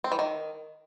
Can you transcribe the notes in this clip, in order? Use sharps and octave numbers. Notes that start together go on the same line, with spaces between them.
C4
E3
D#3